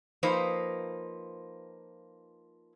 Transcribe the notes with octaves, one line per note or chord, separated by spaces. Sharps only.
F3 A#3 D#4 B4 C5